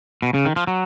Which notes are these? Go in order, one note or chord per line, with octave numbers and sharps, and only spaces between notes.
B2
C#3
D#3
F3
F#3